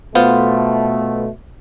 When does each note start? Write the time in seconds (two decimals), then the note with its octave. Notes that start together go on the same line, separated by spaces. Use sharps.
0.15 B2 A3 B3 F4 C5